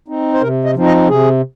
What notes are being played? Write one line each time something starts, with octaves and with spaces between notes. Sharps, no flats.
C4 D#4
C5
C3 A#4
D#5
F3 C4 D#4
D#5
C3 G#4